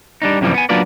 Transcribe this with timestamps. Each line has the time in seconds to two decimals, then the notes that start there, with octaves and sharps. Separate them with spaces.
0.22 G3 D4 D#4
0.41 F#2 C3 E3 F3 G3
0.54 B3 G#5
0.69 F#3 A#3 D4 F4 B4 D5